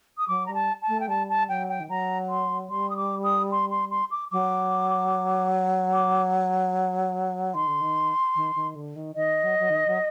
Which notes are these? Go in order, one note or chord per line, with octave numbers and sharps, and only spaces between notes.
D#6
F#3 D6
G3 A#5
A5
A5
A3
G5
G3 A5
A5
F#3 G5
G5
D#3
F#3 A#5
C6
G3 C6
D#6
D6
D#6
C6
C6
C6
D6
F#3 D6
D6
D#3 C6
D3
D#3
D#3
D#3
D3
D#3
D#3 D#5
F#3
F#3
D#3
F#3